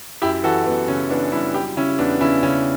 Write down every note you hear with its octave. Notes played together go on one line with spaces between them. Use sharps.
F#2 E4 G4
E3 F#4 A4
F#2 B3
C#3 C#4
E3 B3 D4
G3 C#4 E4
F#3 E4 G4
C#3 C#4 E4
E2 B3 D4
C#3 C#4 E4
C#3 C#4